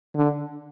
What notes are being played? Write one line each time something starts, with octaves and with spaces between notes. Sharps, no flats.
D3